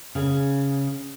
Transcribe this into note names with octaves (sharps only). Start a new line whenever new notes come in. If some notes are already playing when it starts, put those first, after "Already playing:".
C#3